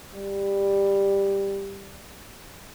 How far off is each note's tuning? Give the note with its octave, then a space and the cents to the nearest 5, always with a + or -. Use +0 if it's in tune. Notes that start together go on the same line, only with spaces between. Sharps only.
G3 +10